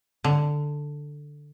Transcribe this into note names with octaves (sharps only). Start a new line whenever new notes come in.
D3